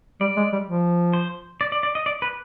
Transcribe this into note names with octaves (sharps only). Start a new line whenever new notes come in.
G3 D5
G#3
G3
F3
C5
D5
D5
D5
D#5
D5
B4